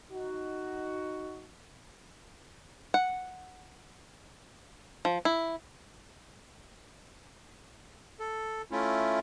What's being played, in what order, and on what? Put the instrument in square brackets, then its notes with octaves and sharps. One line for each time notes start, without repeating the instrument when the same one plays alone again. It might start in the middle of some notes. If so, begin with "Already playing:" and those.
[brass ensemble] D#4 F#4
[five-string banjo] F#5
F3
E4
[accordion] A4
A3 C#4 E4 F4